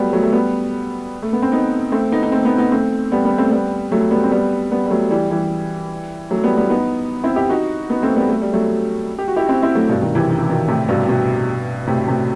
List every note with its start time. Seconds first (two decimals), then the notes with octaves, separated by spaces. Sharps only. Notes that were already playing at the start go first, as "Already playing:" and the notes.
Already playing: F#3 G3 A3 B3
0.13 F#3 A3
0.23 A3
0.33 G3 B3
1.22 A3
1.33 B3
1.42 C4
1.52 B3 D#4
1.92 A3 C4
2.12 B3 D#4
2.23 D#4
2.32 A3 C4
2.45 B3 D#4
2.58 B3 D#4
2.71 A3 C4
3.12 G3 B3
3.25 G3 B3
3.38 A3 C4
3.51 G3 B3
3.92 F#3 A3
4.11 G3 B3
4.24 C4
4.31 G3 B3
4.71 G3 B3
4.86 G3
4.91 F#3 A3
5.11 E3 G3
5.31 E3 G3
6.30 F#3 A3
6.44 G3 B3
6.56 G3 B3
6.70 B3 D#4
7.24 C4 E4
7.36 E4 G4
7.50 D#4 F#4
7.90 B3 D#4
8.02 A3 C4
8.16 G3 B3
8.29 A3
8.42 G3
8.53 F#3 A3
9.19 G4
9.28 F#4
9.36 E4 G4
9.48 C4 E4
9.62 C4 E4
9.75 F#3 A3
9.89 G2 B2
10.02 B2 D#3
10.15 C3 E3
10.29 D#3
10.39 E3
10.49 B2 D#3
10.68 A2 C3
10.88 G2 B2
11.08 G2 B2
11.87 A2 C3
12.07 A2 C3